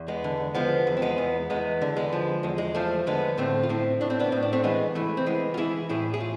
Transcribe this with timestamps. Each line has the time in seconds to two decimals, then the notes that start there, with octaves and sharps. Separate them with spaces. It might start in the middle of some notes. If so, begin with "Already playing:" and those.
Already playing: E2
0.08 G#3 B3
0.24 D3
0.55 F3 G#3 B3
0.87 E2
0.97 C4
1.02 G#3 B3
1.18 E2
1.50 E2 G#3 B3
1.82 D3
1.97 G#3 B3
2.13 F3
2.43 E2 G#3
2.58 G#3
2.75 F3 A3
3.07 D3 G#3 B3
3.37 A2 A3 C4
3.63 F4
3.69 A2 C4 E4
4.01 A2 D4
4.10 C4
4.19 B3 D4
4.32 A2 C4
4.42 D4
4.53 A3 C4
4.64 E3 G#3 B3
4.95 E3 A3
5.17 C4
5.26 E3 G#3 B3
5.54 F4
5.57 E3 E4 G#4
5.89 A2 E4 G#4
6.14 G#4
6.21 F4